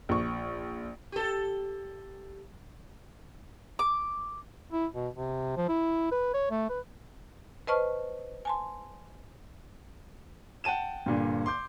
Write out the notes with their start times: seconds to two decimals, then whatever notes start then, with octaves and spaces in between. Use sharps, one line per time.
0.09 A#1 C#6
1.12 G4 A4
3.79 D6
4.71 E4
4.94 B2
5.15 C3
5.57 F3
5.69 E4
6.12 B4
6.34 C#5
6.51 A3
6.69 B4
7.67 B4 C5 D#5 A5 C#6 F6
8.45 G#5 A5 C6
10.64 F#5 G5 A5 D#7 E7
11.06 G2 A#2 D3
11.46 C6 D6 G6